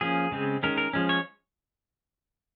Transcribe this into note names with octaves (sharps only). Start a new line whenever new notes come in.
F3 A#3 C#4 G#4
C#3 G#3 C4
D#3 G#3 C#4 A#4
A#4
F3 G#3 C#4
C#5